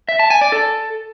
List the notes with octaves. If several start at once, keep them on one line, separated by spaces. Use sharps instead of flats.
E5
A5
G#5
D5
A4